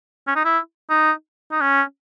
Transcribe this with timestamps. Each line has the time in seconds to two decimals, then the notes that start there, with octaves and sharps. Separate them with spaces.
0.27 C#4
0.36 D#4
0.45 E4
0.90 D#4
1.51 D#4
1.61 C#4